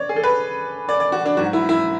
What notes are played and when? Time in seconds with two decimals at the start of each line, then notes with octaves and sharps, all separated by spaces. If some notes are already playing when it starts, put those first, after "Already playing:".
Already playing: C#5 D5
0.09 G#4
0.16 A4
0.23 B4
0.89 D5
1.00 D5
1.12 F#4
1.26 D4
1.37 G#2 F#3 F#4
1.53 E4
1.69 E4